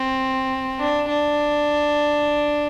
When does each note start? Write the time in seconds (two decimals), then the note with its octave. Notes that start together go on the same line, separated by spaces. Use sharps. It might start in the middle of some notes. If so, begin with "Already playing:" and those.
Already playing: C4
0.79 D4
1.09 D4